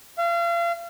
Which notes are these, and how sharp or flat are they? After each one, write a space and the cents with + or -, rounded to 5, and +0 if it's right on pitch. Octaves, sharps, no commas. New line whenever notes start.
F5 -35